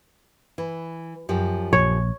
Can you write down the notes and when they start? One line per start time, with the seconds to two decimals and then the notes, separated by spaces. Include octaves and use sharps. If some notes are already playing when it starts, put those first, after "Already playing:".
0.58 E3
1.29 F#2 F3 G4
1.73 A#1 C#5